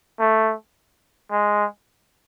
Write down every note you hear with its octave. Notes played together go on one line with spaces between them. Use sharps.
A3
G#3